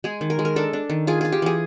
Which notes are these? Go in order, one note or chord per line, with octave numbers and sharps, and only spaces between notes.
G#3 G#4
D#3
A#4
G#3
A#4
D4 A4
D4
D#3
F4 G#4
F4 G#4
G4
E3 G#4